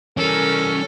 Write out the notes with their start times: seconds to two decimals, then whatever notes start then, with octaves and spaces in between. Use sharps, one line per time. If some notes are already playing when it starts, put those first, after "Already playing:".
0.17 E3 G3 C#4 A4 A#4